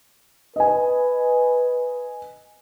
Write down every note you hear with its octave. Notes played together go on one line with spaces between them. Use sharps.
B4 D#5 G#5